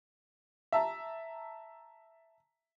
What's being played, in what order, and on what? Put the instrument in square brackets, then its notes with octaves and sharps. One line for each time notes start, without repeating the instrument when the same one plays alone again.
[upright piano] E5 A5 A#5